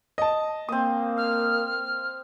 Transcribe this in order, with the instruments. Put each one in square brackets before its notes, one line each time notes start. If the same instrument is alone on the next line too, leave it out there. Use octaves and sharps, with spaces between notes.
[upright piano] D#5 A5
[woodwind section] A#3 [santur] C4 D#6
[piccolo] F6